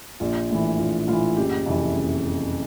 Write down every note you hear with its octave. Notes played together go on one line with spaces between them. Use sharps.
A#1 F4
A2 E3
A#1 F4
A2 E3 F4
F#1 G4
F2 C3 E3
F#1